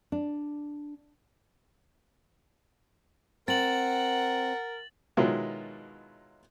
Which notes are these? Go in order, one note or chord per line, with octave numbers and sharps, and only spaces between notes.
D4
C4 A#4 F#5 A6 F#7
B2 D#3 F#3 G#3 E4 F4